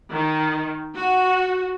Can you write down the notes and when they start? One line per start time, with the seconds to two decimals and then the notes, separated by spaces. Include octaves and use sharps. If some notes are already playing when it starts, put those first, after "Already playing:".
0.11 D#3
0.96 F#4